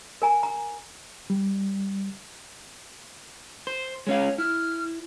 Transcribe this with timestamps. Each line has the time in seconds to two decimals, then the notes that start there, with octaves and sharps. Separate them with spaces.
0.22 A#4 G#5 A#5
0.43 A#5
1.30 G3
3.67 C5
4.07 G#3 C#4 C#5 F5
4.38 E4 F6